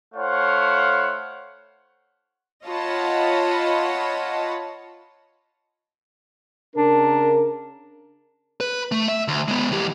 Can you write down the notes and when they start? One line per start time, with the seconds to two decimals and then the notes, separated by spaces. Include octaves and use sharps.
0.15 A3 E4 C5 C#5 F5 F#5
2.66 F4 C#5 D#5 F#5 A5 B5
6.75 C#3 D4 A#4
8.60 B4
8.92 A3
9.08 E5
9.28 D2
9.48 G#3 B3
9.72 E3 G4